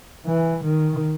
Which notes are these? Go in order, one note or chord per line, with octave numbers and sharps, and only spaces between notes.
E3
D#3